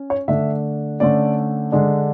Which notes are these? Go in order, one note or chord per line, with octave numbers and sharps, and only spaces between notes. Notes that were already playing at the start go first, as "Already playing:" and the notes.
Already playing: C#4
C#5
D3 A3 D4 E5
D3 A3 C#4 D5
D3 G#3 D4